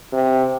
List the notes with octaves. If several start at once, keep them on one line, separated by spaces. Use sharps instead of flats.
C3